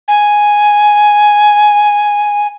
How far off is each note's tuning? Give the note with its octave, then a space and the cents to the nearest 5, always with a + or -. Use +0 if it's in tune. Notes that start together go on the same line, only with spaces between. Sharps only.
G#5 +0